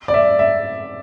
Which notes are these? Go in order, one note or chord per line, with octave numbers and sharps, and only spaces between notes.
D5
E5
E5